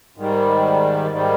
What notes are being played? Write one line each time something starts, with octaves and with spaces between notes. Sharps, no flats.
G#2 D#3 G3
G#2 D#3 G3